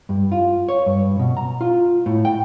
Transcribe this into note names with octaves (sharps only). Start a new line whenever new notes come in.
G2
F4
C#5
G2
B2
A#5
F4
A2
G5